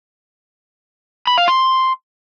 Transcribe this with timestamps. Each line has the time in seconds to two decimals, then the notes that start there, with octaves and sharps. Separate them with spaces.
1.27 B5
1.38 F5
1.48 C6